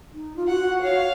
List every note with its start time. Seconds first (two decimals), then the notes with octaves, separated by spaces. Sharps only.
0.12 D#4
0.36 F4
0.48 F#4 F#5
0.82 C#5 F5